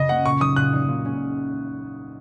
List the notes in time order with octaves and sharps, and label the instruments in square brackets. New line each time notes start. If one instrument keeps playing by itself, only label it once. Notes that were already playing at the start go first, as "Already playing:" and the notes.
Already playing: [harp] F#2 C#3 [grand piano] D#5
[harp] A#3 C#4 [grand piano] F#5
[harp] A#2 [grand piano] C#6
[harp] F#3 D#4 [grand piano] D#6
[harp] A#2 [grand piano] F#6
[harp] F#3 D#4
A#2
G#3 C#4